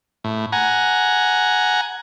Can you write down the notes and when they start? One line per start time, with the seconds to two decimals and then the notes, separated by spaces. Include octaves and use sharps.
0.24 A2
0.52 F#5 G#5 A#5